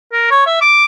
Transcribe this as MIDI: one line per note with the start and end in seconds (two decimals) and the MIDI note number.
0.12 0.29 70
0.31 0.42 73
0.46 0.57 76
0.61 0.85 86